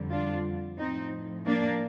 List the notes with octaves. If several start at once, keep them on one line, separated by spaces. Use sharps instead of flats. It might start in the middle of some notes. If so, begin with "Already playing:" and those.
Already playing: F2 D3 G3
D4 F4
A2 F3 C4 D#4
A#3 D4